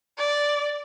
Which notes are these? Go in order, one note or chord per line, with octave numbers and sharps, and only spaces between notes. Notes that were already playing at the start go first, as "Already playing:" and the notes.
D5